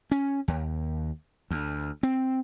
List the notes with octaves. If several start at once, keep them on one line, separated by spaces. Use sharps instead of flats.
C#4
D#2
D2
C4